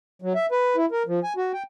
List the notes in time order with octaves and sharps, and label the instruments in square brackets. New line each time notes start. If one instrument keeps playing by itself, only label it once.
[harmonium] F#3
E5
B4
E4
A#4
F3
G#5
F#4
G5